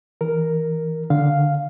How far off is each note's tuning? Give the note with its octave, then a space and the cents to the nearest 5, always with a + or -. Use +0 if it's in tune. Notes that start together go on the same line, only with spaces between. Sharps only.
E3 -20 A#4 +0
D3 +0 F5 +0